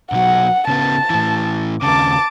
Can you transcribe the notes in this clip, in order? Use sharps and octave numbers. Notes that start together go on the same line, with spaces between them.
B1 F#3 F#5
C#3 B3 A5
A2 E3
D#2 C#3 A5 D6